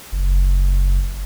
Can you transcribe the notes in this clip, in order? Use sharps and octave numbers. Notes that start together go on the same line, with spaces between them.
F#1